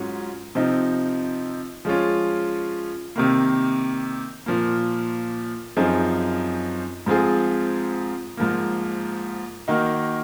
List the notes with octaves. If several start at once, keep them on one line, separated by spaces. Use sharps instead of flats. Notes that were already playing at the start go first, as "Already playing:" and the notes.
Already playing: G#2 F#3 C#4 F4
C3 F3 C4 D#4
F3 G#3 C#4 F4
C3 D#3 A#3
A#2 F3 A#3
F#2 F3 C4 D#4 G#4
G#2 F3 C4 F4 G#4
G#2 F3 A#3
D#3 A#3 D#4 F#4